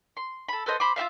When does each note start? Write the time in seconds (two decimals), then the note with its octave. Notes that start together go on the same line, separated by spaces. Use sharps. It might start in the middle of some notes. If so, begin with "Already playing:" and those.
0.17 C6
0.48 A4 B5
0.66 A4 B4 C5 D#5
0.80 C5 B5 C6 D6
0.96 F4 G4 E5 F5